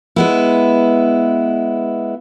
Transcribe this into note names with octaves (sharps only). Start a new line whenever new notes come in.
G#3 B3 E4